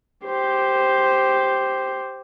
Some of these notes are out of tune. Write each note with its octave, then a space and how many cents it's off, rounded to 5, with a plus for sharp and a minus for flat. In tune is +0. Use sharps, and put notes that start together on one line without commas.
G4 -5 C5 +0